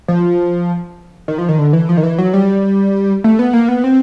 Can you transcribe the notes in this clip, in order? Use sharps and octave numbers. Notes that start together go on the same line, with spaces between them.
F3
D#3
F3
D#3
D3
E3
F3
D#3
E3
F#3
G3
A3
B3
A#3
B3
C4